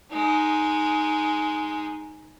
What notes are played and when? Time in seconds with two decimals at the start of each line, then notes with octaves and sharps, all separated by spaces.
0.11 G#3 D#4